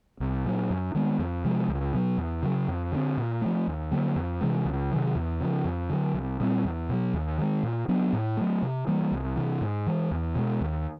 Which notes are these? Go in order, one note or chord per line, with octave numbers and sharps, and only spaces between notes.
C2
A#2 F#3
F#2
D#3 G#3 B3
F2
C3 F3 G#3
C#2
B2 F#3
E2
C#3 F#3
F2
D3 G3 C4
A#2
F3 A3
D#2
D3 F#3 A#3
F2
C3 E3 G#3
C#2
C3 D#3 F#3
E2
C#3 F3
F2
D3 F#3
C2
A#2 G3 C4
E2
B2 F#3
D#2
D#3 G#3
A#2
F#3 B3 D4
A2
F#3 A3
C3
E3 G3 A#3
C2
C3 E3
G#2
E3 G#3
E2
B2 G#3
D#2